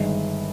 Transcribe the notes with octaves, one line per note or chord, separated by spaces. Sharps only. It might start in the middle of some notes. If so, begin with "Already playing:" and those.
Already playing: G1 G2 D#3 G#3